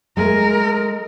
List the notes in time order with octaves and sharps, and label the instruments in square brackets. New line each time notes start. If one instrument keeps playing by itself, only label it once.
[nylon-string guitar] G#3 A3 [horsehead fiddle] A#4